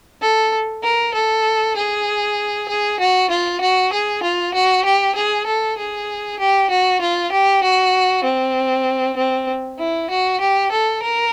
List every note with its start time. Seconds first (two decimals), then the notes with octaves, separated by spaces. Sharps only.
0.22 A4
0.83 A#4
1.14 A4
1.76 G#4
2.68 G#4
2.99 F#4
3.30 F4
3.61 F#4
3.93 G#4
4.23 F4
4.54 F#4
4.85 G4
5.15 G#4
5.46 A4
5.77 G#4
6.39 G4
6.70 F#4
7.01 F4
7.32 G4
7.63 F#4
8.24 C4
9.17 C4
9.78 E4
10.10 F#4
10.40 G4
10.72 A4
11.03 A#4